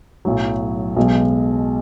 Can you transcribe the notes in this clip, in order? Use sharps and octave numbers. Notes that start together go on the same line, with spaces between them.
B1 A2 F#3
B1 B2 G#3